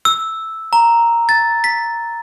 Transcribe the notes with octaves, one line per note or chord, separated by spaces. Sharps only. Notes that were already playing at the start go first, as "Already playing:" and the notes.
E6
A#5
A6
B6